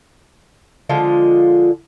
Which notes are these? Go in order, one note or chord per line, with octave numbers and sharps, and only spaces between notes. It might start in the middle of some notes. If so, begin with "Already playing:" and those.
D3 F3 G#3 F4